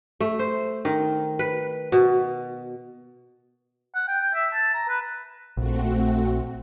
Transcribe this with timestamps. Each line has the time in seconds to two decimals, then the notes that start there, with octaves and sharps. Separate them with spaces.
0.20 A3
0.39 C5
0.85 D#3
1.39 B4
1.92 B2
3.95 F#5
4.08 G5
4.21 G5
4.34 E5
4.54 A5
4.74 A#5
4.89 B4
5.57 A#1 A3 C4 F#4